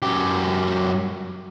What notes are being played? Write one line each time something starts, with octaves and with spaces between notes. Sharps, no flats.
F#2 G4